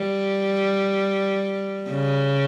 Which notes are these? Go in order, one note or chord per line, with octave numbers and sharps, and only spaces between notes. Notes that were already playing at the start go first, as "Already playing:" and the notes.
Already playing: G3
C#3